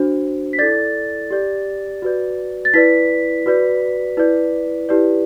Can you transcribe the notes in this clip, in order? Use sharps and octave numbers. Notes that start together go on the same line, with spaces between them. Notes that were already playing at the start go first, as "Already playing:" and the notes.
Already playing: D4 F#4 C5
B6
E4 A4 D5 A6
G4 D5
F#4 B4 D5
A6
E4 B4 D5 B6
F#4 B4 D5
E4 B4 D5
E4 G4 B4 D5